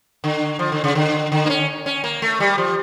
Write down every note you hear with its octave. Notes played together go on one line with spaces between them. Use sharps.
D3
F3
D3
C#3
D3
D3
A#3
C#4
C#4
A#3
A3
G3
F3